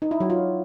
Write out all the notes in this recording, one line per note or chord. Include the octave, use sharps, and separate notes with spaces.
D#4
E4
F#3
F4